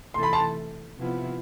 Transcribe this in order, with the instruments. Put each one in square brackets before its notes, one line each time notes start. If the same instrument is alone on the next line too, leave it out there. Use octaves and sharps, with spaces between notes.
[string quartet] C3 E3 A3 E4 A4 [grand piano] C6
[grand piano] B5
A5 C6
[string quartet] C3 F3 B3 E4